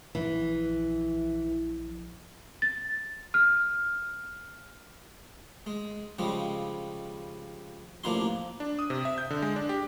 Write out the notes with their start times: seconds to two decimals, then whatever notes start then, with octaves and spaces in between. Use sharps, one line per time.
0.15 A#1 E3 F3
2.62 A6
3.34 F6
5.66 G#3
6.19 C#3 F3 G3 G#3
8.04 A1 F3 A#3 D4 E4 C6
8.60 D4
8.79 D#6
8.90 C3
9.05 E5
9.18 G6
9.30 D3
9.42 G#3
9.56 D4
9.69 G4